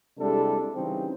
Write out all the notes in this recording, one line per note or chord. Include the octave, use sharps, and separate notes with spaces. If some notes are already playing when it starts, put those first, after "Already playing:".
C3 G3 G#3 D4 E4 A4
C#3 E3 G3 C4 D#4